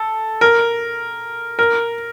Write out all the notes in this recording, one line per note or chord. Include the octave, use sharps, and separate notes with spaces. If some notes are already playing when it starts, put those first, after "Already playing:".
Already playing: A4
A#4
A#4